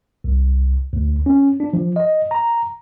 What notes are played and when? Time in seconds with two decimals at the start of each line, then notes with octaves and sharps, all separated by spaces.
0.24 C2
0.93 D2
1.26 C#4
1.60 D4
1.73 F3
1.96 D#5
2.31 A#5